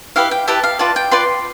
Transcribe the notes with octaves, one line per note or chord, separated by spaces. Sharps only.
E4 G4 B4 F5
G5
E4 G4 B4 A5
F5
F4 B4 D5 A5
G5
F4 B4 D5 C6